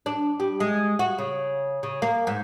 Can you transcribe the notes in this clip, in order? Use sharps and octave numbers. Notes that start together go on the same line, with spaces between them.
D4
G3
G#3
F#4
C#3
C#3
A#3
G#2